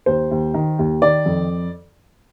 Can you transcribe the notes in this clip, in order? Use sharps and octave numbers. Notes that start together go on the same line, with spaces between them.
D#2 C5
D#2
D#3
D#2
D#3 D5
F2